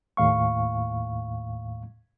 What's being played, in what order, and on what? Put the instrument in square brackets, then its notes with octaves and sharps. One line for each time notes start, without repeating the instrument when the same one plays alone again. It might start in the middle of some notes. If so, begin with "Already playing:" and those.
[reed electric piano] D#2 A2 F5 C#6